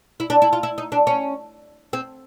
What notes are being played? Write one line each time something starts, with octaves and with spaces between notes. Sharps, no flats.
E4
D4
E4
F4
E4
D#4
D4
C#4
C4